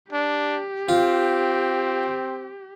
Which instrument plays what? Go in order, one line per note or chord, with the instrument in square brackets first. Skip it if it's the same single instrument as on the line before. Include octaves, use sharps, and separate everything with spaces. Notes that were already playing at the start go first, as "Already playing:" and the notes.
[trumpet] D4 [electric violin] G4
[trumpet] C4 [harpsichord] F4